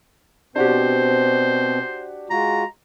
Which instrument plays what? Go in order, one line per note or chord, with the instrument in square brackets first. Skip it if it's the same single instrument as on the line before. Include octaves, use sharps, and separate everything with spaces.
[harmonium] B2 C4 [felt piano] D4 F#4 G4 [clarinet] C5
[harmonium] G#3 F4 F#4 [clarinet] A#5